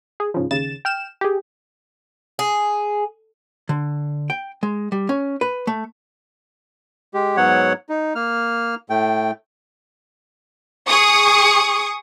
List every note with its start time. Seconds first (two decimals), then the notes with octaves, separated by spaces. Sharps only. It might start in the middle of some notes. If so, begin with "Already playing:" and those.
0.20 G#4
0.34 G#2 C#3 F3
0.51 D#2 C#3 A6 E7
0.85 G5 F6 E7
1.21 G4 G#4
2.39 G#4
3.69 D3
4.30 G5
4.63 G#3
4.92 G3
5.09 C#4
5.41 B4
5.67 A3
7.14 G#3 G4
7.37 G#2 F#3 B3 C#5 F#5
7.89 D#4
8.15 A#3 F6
8.90 A2 A3 G5
10.88 G#4 C#6 D#6